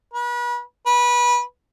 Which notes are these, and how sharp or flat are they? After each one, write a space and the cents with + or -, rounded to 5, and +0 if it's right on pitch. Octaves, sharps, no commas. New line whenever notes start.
B4 -35
B4 -20